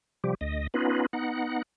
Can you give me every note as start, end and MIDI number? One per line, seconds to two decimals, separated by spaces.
0.24 0.34 48
0.24 0.34 53
0.24 0.34 55
0.24 0.34 67
0.41 0.67 38
0.41 0.67 75
0.74 1.06 59
0.74 1.06 61
0.74 1.06 63
0.74 1.06 65
0.74 1.06 71
1.13 1.62 59
1.13 1.62 63
1.13 1.62 78